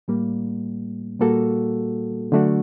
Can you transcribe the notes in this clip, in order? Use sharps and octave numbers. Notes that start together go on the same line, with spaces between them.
A2 G3 A#3
A#2 G3 A#3 F#4 A4
D3 F#3 A3 D4 F#4